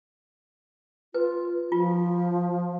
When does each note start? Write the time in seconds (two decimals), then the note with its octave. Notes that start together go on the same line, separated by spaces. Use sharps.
1.14 F4 B4
1.72 F3 F4